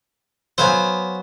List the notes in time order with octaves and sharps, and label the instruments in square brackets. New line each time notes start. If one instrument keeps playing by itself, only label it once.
[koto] F#3 B3 [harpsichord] C5 F5 G#5